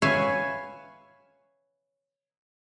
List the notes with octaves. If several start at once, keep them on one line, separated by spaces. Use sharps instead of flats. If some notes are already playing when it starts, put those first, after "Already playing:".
B4 C#5 E5 F5 G#5